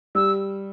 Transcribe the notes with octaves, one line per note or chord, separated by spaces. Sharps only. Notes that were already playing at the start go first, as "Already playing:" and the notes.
G3 E6